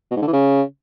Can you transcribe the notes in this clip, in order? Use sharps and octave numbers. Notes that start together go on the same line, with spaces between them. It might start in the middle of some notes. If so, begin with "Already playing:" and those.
B2
G#2
D3
E3
C#3